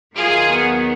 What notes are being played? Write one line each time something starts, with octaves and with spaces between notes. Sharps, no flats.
D#2 D#3 F#3 F4 G#4
B3